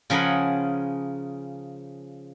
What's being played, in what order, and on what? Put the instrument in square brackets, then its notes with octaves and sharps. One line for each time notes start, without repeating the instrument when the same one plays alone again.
[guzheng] C#3 F3 G#4 A#4 F#5 B5